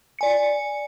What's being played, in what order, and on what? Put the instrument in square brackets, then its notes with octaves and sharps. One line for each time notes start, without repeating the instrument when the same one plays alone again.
[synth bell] D5 G#5 C#7